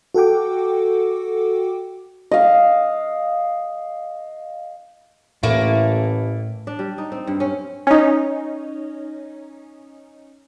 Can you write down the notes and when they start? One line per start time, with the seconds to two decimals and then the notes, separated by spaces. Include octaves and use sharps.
0.14 F#4 A4 F#5 G5 D6
2.31 D#5 F5
5.43 A1 A2 A3 A#3 E4
6.67 D4
6.79 G3
6.98 D#4
7.12 C4
7.27 G2
7.40 C#4
7.87 C#4 D#4